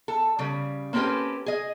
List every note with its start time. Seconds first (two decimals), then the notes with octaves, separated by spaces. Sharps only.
0.08 A4
0.39 C#3 G3
0.93 A#3 C4 C#4 G4 A4 B4
1.46 G#4 D#5